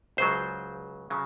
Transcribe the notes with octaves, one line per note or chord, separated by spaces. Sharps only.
C#2 C#3 F#3 C5
C#3 F#3